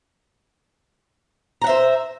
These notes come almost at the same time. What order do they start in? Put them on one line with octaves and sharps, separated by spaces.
A#5 F#5 E5 C5